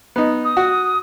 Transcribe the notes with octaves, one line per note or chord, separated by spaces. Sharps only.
B3 D#4
D#6
F#4